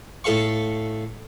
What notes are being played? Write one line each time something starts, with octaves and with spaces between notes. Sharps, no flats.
A2 A4 F5 C#6